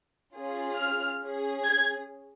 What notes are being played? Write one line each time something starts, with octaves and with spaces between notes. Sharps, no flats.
C#4 F4 G#4
F6
C#4 G#4
G#6